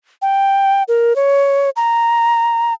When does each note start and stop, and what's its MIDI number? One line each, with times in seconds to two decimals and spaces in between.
0.22 0.83 79
0.88 1.16 70
1.16 1.70 73
1.76 2.73 82